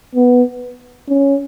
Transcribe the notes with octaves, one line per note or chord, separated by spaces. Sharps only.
B3
C#4